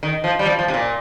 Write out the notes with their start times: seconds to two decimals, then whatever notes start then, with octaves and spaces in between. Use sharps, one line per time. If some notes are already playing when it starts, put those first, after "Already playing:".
0.03 D#3
0.24 F3
0.39 G3
0.46 F3
0.59 F3
0.68 C3
0.74 A#2